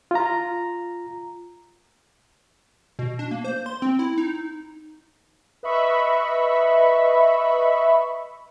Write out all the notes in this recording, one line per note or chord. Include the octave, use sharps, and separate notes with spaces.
F4 A#5
B2
D4
A#3
C5
C6
C4
E4
D#4
B4 D#5 E5 B5 C#6